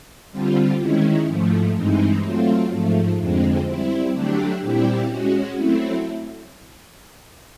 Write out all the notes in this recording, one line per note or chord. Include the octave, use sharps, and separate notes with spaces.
D3 G3 C4 F4
D#3 G#3 C#4 E4
G#2 F3 A3
G2 E3 G#3 C4 D#4
F#3 A3 C4 F4
G#2 F3 A3
F2 D3 F3 G#3 C4
G3 C4 E4
D3 F#3 A3 D4 G4
A#2 G3 C4 E4 G4
G#3 C#4 F#4
F#3 A3 C4 E4